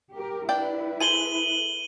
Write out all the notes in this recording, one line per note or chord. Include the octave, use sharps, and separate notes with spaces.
G4 A#4
D4 E4 B4 D5 G5
G#4 A4 C5 D#7 F#7 G7